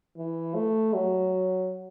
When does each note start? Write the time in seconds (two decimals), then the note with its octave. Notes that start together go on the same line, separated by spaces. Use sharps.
0.17 E3
0.55 A3
0.94 F#3